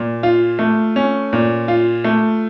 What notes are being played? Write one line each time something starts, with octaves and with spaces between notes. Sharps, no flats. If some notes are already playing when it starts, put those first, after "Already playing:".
Already playing: A#2
F4
A3
C#4
A#2
F4
A3